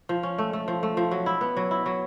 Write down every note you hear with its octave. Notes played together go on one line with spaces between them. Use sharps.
F3
C#4
A3
A3
F3
A3
F3
F#3
E4
B3
F#3
E4
F#3